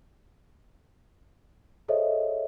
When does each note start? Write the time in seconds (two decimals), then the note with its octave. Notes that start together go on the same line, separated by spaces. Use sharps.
1.88 G#4 A4 C5 C#5 D#5 E5